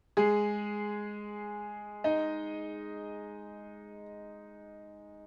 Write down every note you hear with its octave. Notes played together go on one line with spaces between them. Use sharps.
G#3 G#4
D#4 D#5